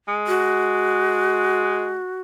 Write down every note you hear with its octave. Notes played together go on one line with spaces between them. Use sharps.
G#3
F#4